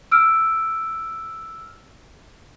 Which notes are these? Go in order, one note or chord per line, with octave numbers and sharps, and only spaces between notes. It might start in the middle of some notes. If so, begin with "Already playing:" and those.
E6 F6 D7